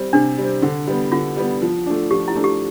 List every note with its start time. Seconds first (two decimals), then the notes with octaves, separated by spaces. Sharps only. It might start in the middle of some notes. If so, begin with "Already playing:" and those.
Already playing: G3 C4
0.13 C3 D4
0.38 G3 C4
0.62 D3
0.87 G3 B3
1.12 D3 F4
1.36 G3 B3
1.62 F3
1.86 A3 D4
2.11 F3 G4
2.28 E4
2.35 A3 D4
2.44 G4